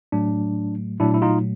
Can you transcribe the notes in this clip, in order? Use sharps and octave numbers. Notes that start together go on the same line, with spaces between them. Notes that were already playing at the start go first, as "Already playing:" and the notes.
A2 F#3 A3 D4
A#2 F#3 A3 D4 E4
E4
D#4 F4